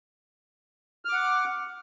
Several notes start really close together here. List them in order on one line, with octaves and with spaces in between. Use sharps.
F6 D6 F#5